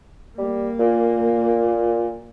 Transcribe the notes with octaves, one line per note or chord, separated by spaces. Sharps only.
G3 A#3
A#2